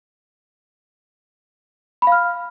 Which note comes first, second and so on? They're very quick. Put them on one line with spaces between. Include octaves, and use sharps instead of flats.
B5 F5 F6